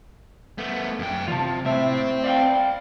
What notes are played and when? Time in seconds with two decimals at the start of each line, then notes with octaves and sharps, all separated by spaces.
0.58 A3 B3
0.99 F#2 G5
1.28 E2 C3 F4 A5
1.66 A2 C4 C5 E5
2.24 D5 F5 G5